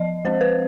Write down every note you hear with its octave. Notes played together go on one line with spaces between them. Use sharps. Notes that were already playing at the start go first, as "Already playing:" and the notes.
Already playing: F3 D#5
G#3 C4 C5
B4